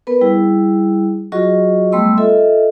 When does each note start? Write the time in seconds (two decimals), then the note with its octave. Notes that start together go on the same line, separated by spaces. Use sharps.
0.07 B3 A#4 B4
0.21 G3 E4 G#4
1.32 F#3 F4 F#4 G#4 D#5 C#6
1.92 G3 A3 B3 C6 E6
2.17 F4 A4 D#5 E5